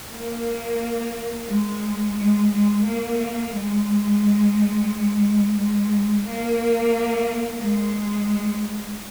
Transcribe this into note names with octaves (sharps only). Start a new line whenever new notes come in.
A#3
G#3
G#3
G#3
A#3
G#3
G#3
A#3
G#3